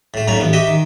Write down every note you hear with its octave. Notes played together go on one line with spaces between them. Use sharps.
A2 A3
B1 F#2 A#2 C#4 A#5
A1 E2 B3
F#4 G4 D#5 E5 G5
D#3